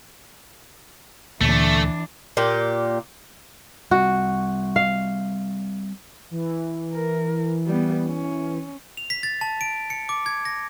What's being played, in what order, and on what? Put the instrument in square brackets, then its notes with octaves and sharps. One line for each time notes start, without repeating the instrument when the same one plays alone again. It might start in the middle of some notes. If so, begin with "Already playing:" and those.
[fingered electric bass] D2 A#2 [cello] E3 D4 [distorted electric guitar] A3
[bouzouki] A#2 G4
[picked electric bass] G3 C4 [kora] F#4
[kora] F5
[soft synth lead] E3
[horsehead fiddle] A#4
G3 B3
C#4
[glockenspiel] F7
B6
A6
A5
D7
C#7
D6
G#6
A#6